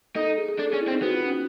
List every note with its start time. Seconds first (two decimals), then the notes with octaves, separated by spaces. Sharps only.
0.15 D#4 A4
0.27 A4
0.37 G#4
0.49 G#4
0.59 D4 A4
0.70 C#4 G#4
0.81 E4
0.88 C4
0.92 D#4
1.02 B3 F#4
1.14 F4
1.25 C#4